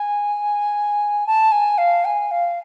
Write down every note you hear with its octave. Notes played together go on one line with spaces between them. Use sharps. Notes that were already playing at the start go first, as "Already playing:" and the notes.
Already playing: G#5
A5
G#5
F5
G#5
F5